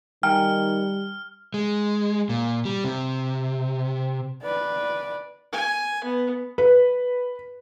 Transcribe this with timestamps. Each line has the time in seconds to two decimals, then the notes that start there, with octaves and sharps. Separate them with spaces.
0.23 D#3 G3 G5 G#5 A#5 F6
1.54 G#3
2.29 A#2
2.65 G3
2.84 C3
4.43 B4 D5
5.52 G#5
6.04 B3
6.58 B4